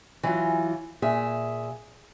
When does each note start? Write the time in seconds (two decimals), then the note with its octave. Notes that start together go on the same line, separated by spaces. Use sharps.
0.23 E3 F#3 F4
1.02 A#2 G#4 E5